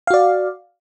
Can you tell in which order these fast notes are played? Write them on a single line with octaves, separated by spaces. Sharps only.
F5 F#4 D5